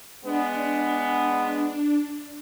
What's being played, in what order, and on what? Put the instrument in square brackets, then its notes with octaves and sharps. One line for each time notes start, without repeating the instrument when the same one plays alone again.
[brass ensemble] G#3 B3 [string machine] D4